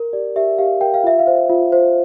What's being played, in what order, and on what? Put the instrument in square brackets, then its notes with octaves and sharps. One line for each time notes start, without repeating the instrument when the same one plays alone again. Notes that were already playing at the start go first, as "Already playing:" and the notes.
Already playing: [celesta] A#4
G4 D5
G4 E5
G4 F5
A#4 G5
F5
F4 E5
F5
C5
F4
C5